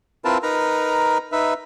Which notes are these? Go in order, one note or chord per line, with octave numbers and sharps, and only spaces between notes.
C4 E4 F4 A#4 B4 A5
D#4 A#4 B4 A#5
D#4 B4 E5